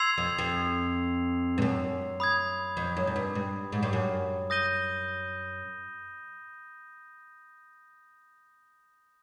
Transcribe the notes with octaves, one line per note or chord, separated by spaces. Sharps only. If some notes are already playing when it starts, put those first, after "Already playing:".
Already playing: C6 E6 G#6 C7 F7
F2
F2
G2
F#2
B5 D#6 G#6
F2
F#2
F#2
G2
G2
G#2
G2
F#2
D#6 G6 A#6 D#7 G7